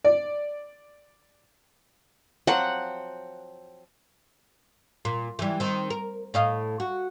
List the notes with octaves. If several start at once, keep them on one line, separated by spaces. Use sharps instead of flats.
D5
F3 F#3 C4 F#5
A#2
E3 G3
D#3 C4
A#4
A2 D#5 F5
F#4